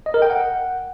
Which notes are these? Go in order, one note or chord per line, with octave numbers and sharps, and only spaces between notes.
D#5
A#4
G5
F#5